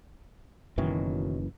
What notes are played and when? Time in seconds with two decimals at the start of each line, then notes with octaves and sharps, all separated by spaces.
0.78 F#1 F#2 B2 D#3 E3 F#3